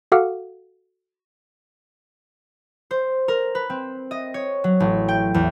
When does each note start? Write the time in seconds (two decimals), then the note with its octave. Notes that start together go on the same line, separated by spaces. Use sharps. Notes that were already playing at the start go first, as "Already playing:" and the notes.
0.12 F#4 A4 F5 F#5 D6 F6
2.91 C5
3.28 A#4
3.55 B4
3.70 C4
4.11 D#5
4.34 C#5
4.64 F#3
4.80 A1
5.08 G5
5.34 E2